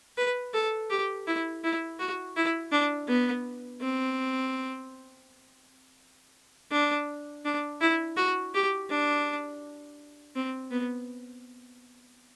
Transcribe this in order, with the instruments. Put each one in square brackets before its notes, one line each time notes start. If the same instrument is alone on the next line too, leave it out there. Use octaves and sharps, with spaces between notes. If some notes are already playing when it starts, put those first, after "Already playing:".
[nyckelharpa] B4
A4
G4
E4
E4
F#4
E4
D4
B3
C4
D4
D4
E4
F#4
G4
D4
C4
B3